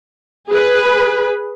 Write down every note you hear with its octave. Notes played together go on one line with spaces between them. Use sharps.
G#4 B4